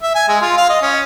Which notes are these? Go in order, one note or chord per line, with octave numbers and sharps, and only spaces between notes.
E5
G#5
G#3
F4
F5
D#5
C#4